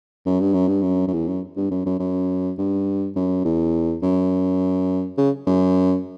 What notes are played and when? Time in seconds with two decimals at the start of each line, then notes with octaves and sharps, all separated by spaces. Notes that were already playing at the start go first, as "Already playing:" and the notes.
0.26 F#2
0.40 G2
0.54 F#2
0.68 G2
0.82 F#2
1.08 F#2
1.13 E2
1.27 F#2
1.57 G2
1.71 F#2
1.86 F#2
1.99 F#2
2.58 G2
3.16 F#2
3.45 E2
4.03 F#2
5.18 C#3
5.47 F#2